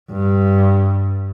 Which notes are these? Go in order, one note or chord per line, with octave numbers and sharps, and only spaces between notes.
G2